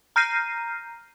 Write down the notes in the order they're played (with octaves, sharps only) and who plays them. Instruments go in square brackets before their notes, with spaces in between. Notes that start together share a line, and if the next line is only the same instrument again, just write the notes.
[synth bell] A#5 F6 G6 A#6 C7 D#7